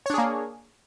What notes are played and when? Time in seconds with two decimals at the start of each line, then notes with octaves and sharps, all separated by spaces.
0.06 C#5
0.10 D4
0.14 G#4
0.18 A#3